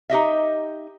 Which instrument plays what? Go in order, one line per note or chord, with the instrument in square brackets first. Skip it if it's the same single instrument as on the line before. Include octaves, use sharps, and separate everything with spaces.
[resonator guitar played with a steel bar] D#4 G4 D#5 E5